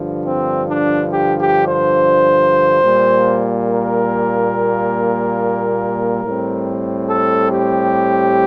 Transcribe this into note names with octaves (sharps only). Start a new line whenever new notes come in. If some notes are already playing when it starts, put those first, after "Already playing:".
Already playing: G2 D3 F3
C4
D4
G4
G4
C5
A#2 G3 A#3
A#4
A2 G3 C4
A4
G4